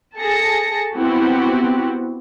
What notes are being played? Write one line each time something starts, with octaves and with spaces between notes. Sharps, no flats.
G#4 A4 A5 A#6 C#7
B3 C4 E4 F#4 G4